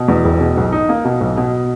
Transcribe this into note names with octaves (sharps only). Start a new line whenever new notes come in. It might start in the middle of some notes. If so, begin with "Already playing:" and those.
Already playing: B2
E2
E1
B2
B1
D#4
A#3
B2
B1
B2